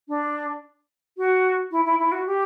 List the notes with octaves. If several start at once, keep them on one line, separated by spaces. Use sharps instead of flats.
D4
F#4
E4
E4
E4
F#4
G4